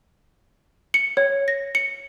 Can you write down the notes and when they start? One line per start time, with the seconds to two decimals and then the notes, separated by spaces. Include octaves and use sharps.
0.94 C#7
1.17 C#5
1.48 A#6
1.75 C#7